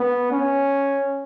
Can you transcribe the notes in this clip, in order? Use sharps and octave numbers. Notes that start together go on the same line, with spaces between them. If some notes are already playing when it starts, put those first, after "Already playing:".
Already playing: B3
C#4